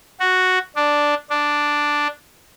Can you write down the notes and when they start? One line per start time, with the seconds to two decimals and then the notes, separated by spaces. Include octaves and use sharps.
0.20 F#4
0.76 D4
1.30 D4